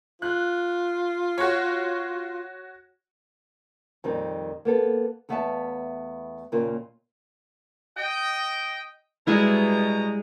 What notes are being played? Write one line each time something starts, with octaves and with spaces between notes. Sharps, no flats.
F4 F#6
F#4 C#5
F2 A#2 D#3 G3 C4
A#3 B3 A4
E2 A3 B3 E5 F5 A5
D#2 A#2 C#3 A#3 F4
D#5 G5
B2 G3 G#3 E4 A#5